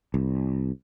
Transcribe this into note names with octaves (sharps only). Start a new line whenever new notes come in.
C2